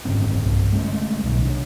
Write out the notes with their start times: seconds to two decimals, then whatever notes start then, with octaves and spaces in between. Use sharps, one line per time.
0.05 F#1 G#2 C4 C#4
0.44 B1 G2 C3
0.72 G#3 A3 C#4
1.24 B1 B2 D#3
1.42 C3 D4